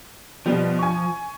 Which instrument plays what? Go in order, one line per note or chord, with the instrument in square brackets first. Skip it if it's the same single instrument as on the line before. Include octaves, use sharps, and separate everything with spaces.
[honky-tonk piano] B2 G3 [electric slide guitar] F3
[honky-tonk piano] G#5 C#6